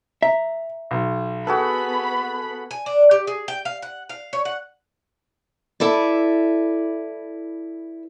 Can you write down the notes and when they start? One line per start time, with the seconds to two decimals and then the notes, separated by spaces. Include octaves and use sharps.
0.23 E5 A#5
0.91 B1
1.47 B3 F#4 G#4 A4 B4 B5
2.71 G#5
2.86 D4
3.11 G4
3.27 G#4
3.48 G5
3.65 F5
3.82 F#5
4.09 F5
4.33 C#5
4.45 F#5
5.80 E4 A4 B4 D5